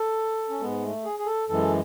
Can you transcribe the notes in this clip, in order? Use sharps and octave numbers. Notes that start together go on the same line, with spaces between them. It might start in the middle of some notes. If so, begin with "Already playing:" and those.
Already playing: A4
C#4
G#2 G#3 B3
A3
G#4
G#4
A4
F#2 E3 G#3 A4